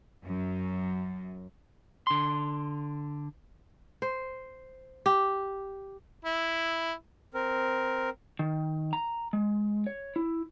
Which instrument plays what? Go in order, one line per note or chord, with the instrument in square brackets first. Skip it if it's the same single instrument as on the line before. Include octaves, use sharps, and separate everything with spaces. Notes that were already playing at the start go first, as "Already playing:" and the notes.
[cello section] F#2
[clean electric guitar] D3 C6
[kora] C5
G4
[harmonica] E4
[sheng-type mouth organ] C4 A#4
[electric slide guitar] D#3
A#5
G#3
C#5
E4